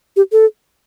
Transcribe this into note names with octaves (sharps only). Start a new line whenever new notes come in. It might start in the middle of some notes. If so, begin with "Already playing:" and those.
G4
A4